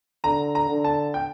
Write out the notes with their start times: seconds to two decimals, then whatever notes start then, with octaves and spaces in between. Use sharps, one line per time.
0.24 D3 A#5
0.55 A#5
0.69 D3
0.84 A5
1.14 G5